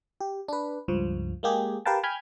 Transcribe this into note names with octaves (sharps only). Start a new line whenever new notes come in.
G4
D4 B4
C#2 G2 F3
G#3 A#3 G4 G#4
G4 A#4 B4 F5 G5 A5
G5 G#5 B5 F6 G6 G#6